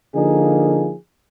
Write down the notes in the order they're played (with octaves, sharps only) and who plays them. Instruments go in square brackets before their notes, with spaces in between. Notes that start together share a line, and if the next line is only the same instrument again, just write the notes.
[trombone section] D3 F3 A#3 D#4 G#4